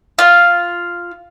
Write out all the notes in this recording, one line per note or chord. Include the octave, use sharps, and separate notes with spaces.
F4